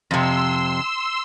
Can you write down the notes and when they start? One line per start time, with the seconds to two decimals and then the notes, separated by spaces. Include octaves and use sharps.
0.11 F2 C3 C6 E6